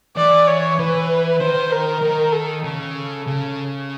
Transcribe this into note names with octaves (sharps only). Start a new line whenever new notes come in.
E3 D5
C#5
E3 B4
D#3 C5
A#4
D#3
A4
C#3 A4
C#3